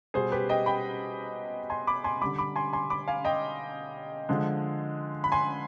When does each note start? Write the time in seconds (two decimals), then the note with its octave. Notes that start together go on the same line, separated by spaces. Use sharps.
0.14 B2 G3 G#4 C5
0.32 G4 B4
0.49 D#5 G5
0.66 G5 B5
1.70 G#5 C6
1.87 B5 D6
2.04 G#5 C6
2.21 D3 G3 B5 D6
2.38 B5 D6
2.56 G#5 C6
2.73 G#5 C6
2.90 B5 D6
3.08 F5 G#5
3.24 D#5 G5
4.29 D3 F3 G#3
5.24 B5
5.32 G#5 C6